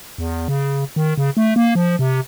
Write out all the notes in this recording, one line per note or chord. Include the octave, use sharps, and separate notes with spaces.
E2
C#3
D#3
C#3
A3
A#3
F3
C3